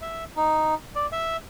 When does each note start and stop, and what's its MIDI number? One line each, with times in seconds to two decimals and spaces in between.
0.02 0.24 76
0.36 0.74 63
0.95 1.07 74
1.12 1.37 76